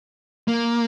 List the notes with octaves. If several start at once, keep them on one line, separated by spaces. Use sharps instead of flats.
A#3